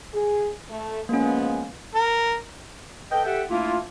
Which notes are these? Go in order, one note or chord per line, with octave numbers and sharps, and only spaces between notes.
G#4
A3
F3 G#3 A#3 B3 C#4
A#4
A4 B4 D#5 G5
G4 A4 E5 F#5
A3 A#3 D4 E4 F4